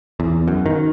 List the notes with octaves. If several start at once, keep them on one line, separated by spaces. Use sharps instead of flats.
E2
F#2
D#3